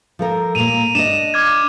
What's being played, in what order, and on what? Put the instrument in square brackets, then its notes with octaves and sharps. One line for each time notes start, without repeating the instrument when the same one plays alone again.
[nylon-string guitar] F3 A4 A#4
[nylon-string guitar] A#2 A#3 [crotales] D#7 F7
[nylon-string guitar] D4 D#5 [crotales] E7
[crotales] D6 F6 G#6